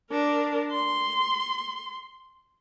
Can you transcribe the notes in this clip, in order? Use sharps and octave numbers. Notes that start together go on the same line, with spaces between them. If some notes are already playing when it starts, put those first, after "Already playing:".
D4 A#4
C6